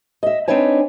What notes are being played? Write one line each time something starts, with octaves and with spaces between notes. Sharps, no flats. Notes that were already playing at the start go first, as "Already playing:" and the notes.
D#5 E5
C4 D4 D#4 B4 C#5 G#5